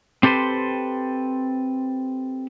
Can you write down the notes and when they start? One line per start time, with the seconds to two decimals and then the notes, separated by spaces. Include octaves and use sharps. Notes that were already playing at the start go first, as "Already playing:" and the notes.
0.23 C4 G4 A4 B4 C5